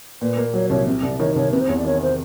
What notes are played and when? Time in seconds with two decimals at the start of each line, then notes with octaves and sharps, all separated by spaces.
0.21 A#2 B4
0.37 A#3
0.53 F#3 C#5
0.70 C2 C#5
0.87 C3
1.03 C2 D5
1.19 D#3 C#5
1.36 C2 C#5
1.52 C3 B4
1.60 C5
1.68 E2 C#5
1.77 D5
1.85 D#3 C#5
2.02 C5